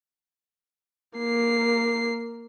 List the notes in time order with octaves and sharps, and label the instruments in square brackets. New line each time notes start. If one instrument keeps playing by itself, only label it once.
[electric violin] A#3 C7